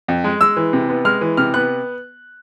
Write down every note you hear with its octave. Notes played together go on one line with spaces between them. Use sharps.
F2
G#3
G#3 E6
E3
C3
B3
G#3 F6
E3
C3 F6
B3 F#6